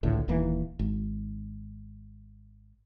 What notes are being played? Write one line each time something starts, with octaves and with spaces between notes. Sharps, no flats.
G#1 C#2 A2 D3
D#1 D#2 E3 A#3
G#1